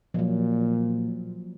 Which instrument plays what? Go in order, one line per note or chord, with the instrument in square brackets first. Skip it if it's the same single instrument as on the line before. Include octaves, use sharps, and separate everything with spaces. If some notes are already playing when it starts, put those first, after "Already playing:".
[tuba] A#2 [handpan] F3 F#3